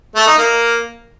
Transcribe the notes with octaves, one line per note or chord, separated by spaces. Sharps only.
A3
D#4
A#3